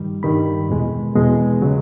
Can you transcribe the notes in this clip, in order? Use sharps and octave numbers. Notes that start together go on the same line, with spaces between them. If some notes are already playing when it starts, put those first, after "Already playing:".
Already playing: G2 D#3 G3
G2 D#3 G3 B5
E2 B2 G#3
E2 B2 G#3
C#3 F#3